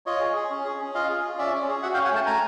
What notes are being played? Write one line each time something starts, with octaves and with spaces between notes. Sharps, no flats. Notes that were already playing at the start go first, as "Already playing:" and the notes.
F4 C#5 D#5
G#4
G#4
C#4
G#4
C#4
F4 D#5 F5
G#4
F4
C#4 D5 E5
C#4
G#4
F#4 E5 F#5
F5 G5
C#4
F#5 G#5
A3 G5 A5
A3 G#5 A#5